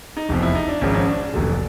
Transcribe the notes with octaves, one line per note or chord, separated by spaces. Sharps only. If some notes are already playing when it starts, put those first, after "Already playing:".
D#4
F1 E2 C3 F3
E4
D#4
D4
G#1 G#2 F3 C#4
C#4
D4
F1 D#2 D3 F#3